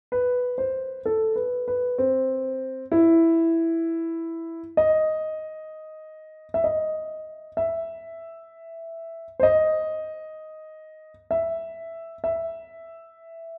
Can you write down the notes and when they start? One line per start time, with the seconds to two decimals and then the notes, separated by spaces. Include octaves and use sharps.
0.12 B4
0.58 C5
1.06 A4
1.36 B4
1.68 B4
1.98 C4
2.92 E4
4.77 D#5
6.54 E5
6.64 D#5
7.57 E5
9.40 C5
9.43 D#5
11.31 E5
12.24 E5